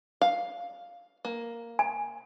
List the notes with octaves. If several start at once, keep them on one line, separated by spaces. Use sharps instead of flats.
F5
A#3
G#5